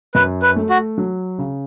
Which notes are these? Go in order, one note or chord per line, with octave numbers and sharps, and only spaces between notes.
F#2 B4
B4
A3
F#4
F#3
C#3